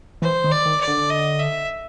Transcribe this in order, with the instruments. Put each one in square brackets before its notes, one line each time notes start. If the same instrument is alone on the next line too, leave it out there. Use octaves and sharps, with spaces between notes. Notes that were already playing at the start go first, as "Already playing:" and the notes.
[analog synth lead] E3 [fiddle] C5
[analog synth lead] D#3
[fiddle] D5
[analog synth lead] D#3
[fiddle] D5
[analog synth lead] D3
[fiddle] D#5
E5